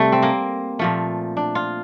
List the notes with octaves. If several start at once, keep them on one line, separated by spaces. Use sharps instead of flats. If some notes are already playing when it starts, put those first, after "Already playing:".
Already playing: C3 G3 A3
C4
A#3
A#2 F3 A3
D4
F4